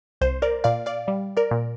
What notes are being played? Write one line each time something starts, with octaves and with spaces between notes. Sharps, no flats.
C2 C5
A#4 D5
A#2 D5 F5
D5 F5
G3
A#4 D5
A#2